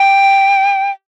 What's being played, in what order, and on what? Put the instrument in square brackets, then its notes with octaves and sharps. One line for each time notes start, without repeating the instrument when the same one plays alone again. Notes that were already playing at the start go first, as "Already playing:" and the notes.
Already playing: [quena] G5